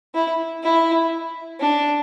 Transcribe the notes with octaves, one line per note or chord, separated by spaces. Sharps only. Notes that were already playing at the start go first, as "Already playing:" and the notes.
E4
E4
D4